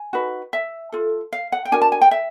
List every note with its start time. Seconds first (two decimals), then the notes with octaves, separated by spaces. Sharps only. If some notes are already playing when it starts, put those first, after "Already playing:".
Already playing: G#5
0.13 D#4 F#4 B4
0.53 E5
0.92 F4 A4
1.33 F5
1.52 F#5
1.65 G5
1.72 D4 F#4 A#4 G#5
1.82 A5
1.92 G#5
2.02 G5
2.11 E5